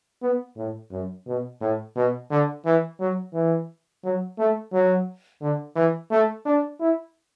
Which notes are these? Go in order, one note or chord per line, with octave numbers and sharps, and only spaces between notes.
B3
A2
F#2
B2
A2
B2
D3
E3
F#3
E3
F#3
A3
F#3
D3
E3
A3
D4
E4